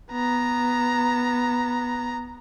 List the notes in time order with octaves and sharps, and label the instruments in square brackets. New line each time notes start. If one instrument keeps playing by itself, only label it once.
[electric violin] B3 A#5